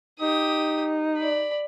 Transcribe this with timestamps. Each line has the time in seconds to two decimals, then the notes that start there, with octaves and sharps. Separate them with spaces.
0.20 D#4 G4 D#6
1.17 D5 B5